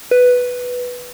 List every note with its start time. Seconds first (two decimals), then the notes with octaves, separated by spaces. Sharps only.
0.11 B4